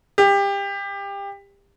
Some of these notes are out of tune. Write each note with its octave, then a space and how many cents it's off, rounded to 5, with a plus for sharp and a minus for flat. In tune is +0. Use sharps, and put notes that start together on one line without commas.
G4 +25